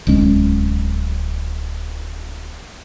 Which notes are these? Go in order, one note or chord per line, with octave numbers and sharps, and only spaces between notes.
D1 C2 G#3 C#4